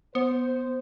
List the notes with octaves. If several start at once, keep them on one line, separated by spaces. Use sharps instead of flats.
B3 C5